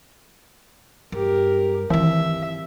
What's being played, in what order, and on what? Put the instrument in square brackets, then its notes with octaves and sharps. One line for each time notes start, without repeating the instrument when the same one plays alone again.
[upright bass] G2 [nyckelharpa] G4 A#4
[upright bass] D#3 C4 [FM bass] E3 [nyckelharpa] E5